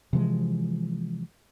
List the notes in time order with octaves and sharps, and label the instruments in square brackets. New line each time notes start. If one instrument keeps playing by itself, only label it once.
[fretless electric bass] C3 E3 F3 G#3